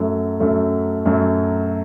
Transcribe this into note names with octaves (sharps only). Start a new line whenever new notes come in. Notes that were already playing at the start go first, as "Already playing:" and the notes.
Already playing: F#2 F#3 A3
F#2 F#3 A3
F#2 F#3 A3